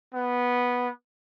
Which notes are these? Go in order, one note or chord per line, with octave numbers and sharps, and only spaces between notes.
B3